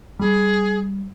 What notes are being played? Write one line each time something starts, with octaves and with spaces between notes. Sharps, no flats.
G3 G#4